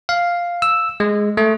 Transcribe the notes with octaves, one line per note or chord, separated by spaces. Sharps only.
F5
E6
G#3
A3